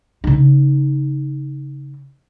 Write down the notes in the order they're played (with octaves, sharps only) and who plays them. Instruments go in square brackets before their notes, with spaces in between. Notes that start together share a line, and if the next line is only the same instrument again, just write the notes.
[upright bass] C#3 D#4